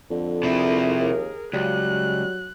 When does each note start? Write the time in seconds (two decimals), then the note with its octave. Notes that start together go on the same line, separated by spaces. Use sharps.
0.11 F2 D3
0.43 C3 E4 G#4 A#4
0.99 D#2
1.53 C#2 F#3 G3 F#6